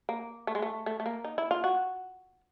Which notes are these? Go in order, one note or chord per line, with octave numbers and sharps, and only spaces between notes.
A#3
A3
G#3
A3
A3
A3
A#3
D#4
E4
F4
F#4